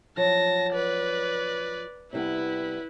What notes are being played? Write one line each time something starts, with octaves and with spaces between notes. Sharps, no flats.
F3 F#3 A5 A#6
B4 D5
C3 G3 B3 E4 B4